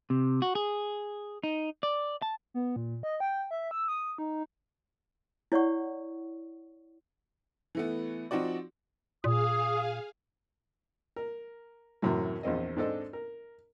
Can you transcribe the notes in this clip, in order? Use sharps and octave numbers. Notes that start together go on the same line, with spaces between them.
C3
F#4
G#4
D#4
D5
A5
B3
A#2
D#5
G5
E5
E6
D#6
D#4
E4 C#5 D5 F#5 C#6
E3 A3 B3
F3 C4 D#4 F#4 D5
A#2 G#4 F5 D#6
A#4
F#2 A2 C3 E3 F#3
A#1 E2 C4 D#5
G#2 C4 D4 A4 D#5
A#4